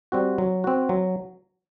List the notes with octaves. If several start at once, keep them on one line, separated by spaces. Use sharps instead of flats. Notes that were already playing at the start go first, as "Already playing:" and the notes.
G3 C4 F#4
F#3
C4 F#4
F#3